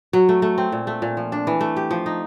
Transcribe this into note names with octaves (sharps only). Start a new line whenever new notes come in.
F#3
A3
A3
C4
A#2
A3
A#2
F3
D4
E3
A3
G4
F3
D#4